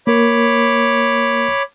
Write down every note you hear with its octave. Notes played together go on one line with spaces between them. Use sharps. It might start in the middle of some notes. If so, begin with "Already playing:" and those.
A#3 A#4 C#5 B5 D6